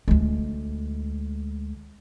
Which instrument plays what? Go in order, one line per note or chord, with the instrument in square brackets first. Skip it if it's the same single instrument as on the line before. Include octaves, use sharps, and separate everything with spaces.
[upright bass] D2 G#3